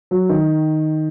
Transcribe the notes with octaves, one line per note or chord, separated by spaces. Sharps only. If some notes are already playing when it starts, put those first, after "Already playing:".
F#3
D#3